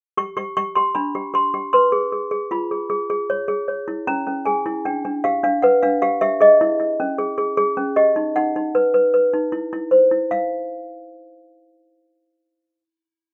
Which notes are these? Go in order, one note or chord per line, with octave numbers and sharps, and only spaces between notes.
G4 C#6
G4 C#6
G4 C#6
G4 C6
D4 B5
G4
G4 C6
G4
B4 C6
G#4
G#4
G#4
F4 B5
G#4
G#4
G#4
C#5
G#4
C#5
E4
C#4 A#5
C#4
G#4 G#5
E4
D4 G5
D4
G4 F5
D4 F5
B4 F#5
D4 F5
G4 F5
G4 E5
G#4 D#5
E4
E4
C#4
G#4
G#4
G#4
C#4
G4 D#5
D#4
D#4 F#5
D#4
B4
B4
B4
D#4
E4
E4
C5
E4
E4 F5